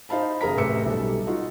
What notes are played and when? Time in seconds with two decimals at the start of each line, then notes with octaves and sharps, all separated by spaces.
0.09 D#4 C5 F5 A5 B5
0.41 F#1 G#4 A#4 A#5 B6
0.57 A1 C3 A3 B4 E6 C#7
0.86 B1 G3 A4
1.27 D#4 F4 F#4